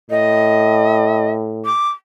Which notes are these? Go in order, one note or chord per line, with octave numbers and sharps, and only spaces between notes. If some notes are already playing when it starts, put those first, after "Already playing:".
A2 D#5
D6